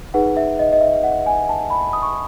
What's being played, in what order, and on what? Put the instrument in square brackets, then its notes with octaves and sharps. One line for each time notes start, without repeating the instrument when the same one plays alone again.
[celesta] D#4 G#4 B4 F#5
E5
D#5
D#5
E5
F#5
G#5
A5
B5
D#6
C#6